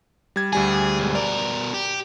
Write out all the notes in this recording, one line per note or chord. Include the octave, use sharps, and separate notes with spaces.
G3 G#6
D2 G3 G#4 G#5
B1 G#2
B2 A#4 D5
G4